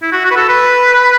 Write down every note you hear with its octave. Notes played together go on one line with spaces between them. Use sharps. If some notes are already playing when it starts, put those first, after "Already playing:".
E4
F#4
F#4
B4
A4
B4